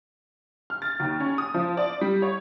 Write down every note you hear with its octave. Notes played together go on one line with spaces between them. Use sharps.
F6
A6
D#2
C#4
D#6
F3
D5
G3
C#5